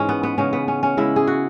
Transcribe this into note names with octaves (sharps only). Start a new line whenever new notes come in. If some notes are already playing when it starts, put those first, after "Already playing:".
Already playing: G#2 E3 G#3 C#4
B3
B3
C#3 G#3 C#4
B3
C#4
C#4
C#3 G#3 E4
G#4
F#4